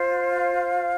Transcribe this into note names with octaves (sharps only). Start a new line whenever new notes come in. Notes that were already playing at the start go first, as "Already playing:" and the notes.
Already playing: F4 C5
F5